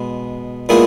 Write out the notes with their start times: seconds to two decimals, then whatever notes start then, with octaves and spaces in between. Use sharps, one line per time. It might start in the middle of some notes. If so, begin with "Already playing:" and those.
Already playing: B2 G#3
0.69 A#2 G#3 B3 E4 G#4